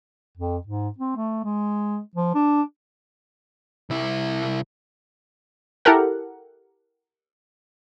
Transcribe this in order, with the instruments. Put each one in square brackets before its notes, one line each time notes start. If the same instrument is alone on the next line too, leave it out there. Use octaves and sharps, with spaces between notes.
[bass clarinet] F2
G#2
C4
A3
G#3
F3
D4
[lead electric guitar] C2 E4
[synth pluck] E4 G4 A4 A#4 F#5